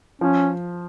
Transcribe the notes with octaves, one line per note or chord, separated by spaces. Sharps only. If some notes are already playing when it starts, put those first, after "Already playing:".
F3 C#4